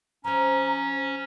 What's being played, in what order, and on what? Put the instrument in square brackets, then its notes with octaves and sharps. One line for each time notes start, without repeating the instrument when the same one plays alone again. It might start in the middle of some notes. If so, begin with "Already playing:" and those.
[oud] F3 C4 [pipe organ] C#4 [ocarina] A#5